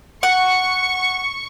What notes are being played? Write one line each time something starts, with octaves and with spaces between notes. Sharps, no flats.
F#5 C#6